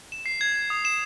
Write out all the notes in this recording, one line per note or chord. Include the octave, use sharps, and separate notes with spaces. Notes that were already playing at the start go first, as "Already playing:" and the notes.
E7
C7
G#6
G#6
D#6
E7